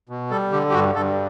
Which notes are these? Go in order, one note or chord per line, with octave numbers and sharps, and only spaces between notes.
B2
G3 A4
D3 G4
G4
G2 F#4
G2 A4